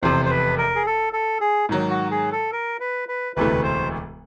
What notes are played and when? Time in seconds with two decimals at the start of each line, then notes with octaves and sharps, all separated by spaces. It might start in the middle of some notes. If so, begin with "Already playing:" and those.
0.03 F1 E2 C3 C5
0.25 C5
0.30 B4
0.58 A#4
0.75 G#4
0.86 A4
1.13 A4
1.41 G#4
1.69 G#2 D#3 F#3
1.89 F#4
2.11 G#4
2.32 A4
2.52 A#4
2.80 B4
3.09 B4
3.36 E1 D2 C3 E3 A3 B4
3.63 C5